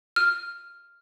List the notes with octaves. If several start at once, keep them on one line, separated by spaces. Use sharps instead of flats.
F6